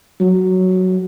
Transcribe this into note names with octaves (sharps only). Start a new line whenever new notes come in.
F#3